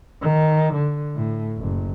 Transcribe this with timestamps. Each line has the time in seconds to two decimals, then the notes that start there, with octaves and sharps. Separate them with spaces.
0.21 D#3
0.74 D3
1.15 A2
1.58 F#1